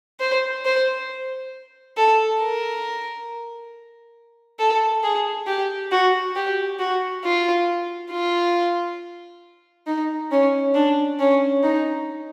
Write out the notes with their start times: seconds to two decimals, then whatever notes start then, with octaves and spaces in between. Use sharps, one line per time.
0.20 C5
0.65 C5
1.97 A4
2.40 A#4
4.59 A4
5.04 G#4
5.47 G4
5.92 F#4
6.36 G4
6.79 F#4
7.24 F4
8.11 F4
9.87 D#4
10.32 C#4
10.75 D4
11.19 C#4
11.63 D#4